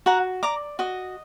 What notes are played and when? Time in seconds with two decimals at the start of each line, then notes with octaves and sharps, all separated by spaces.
0.06 F#4 F#5 A#5
0.43 D5 A#5 D6
0.79 F#4 D#5